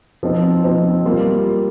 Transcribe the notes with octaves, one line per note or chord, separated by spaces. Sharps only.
F3 C4 D#4
F3 C4 D#4
G3 A#3 F4